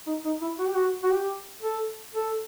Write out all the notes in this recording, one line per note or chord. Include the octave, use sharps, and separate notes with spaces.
D#4
D#4
E4
F#4
G4
F#4
F#4
G4
A4
A4